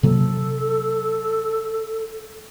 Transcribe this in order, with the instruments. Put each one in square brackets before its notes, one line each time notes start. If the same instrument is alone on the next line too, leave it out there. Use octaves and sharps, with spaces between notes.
[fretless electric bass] C3 F#3 A#3 [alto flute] A4